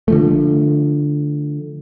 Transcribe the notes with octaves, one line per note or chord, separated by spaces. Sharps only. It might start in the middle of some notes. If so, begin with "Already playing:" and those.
D3 F3 A3